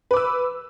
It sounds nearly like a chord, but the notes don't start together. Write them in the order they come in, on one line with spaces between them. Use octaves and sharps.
B4 D6 E6